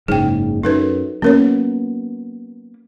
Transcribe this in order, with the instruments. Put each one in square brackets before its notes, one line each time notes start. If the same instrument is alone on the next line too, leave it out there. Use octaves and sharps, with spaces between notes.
[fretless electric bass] F#1 G#2 C#3 [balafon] G#4 G5
[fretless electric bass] F#2 [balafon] D#4 A4 B4
[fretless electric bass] F#3 A#3 B3 [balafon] C#4 A#4 C#5